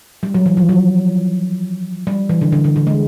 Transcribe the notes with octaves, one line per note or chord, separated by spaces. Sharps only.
G3
F#3
E3
F3
F#3
G3
E3
D3
D3
D3
D3
G#3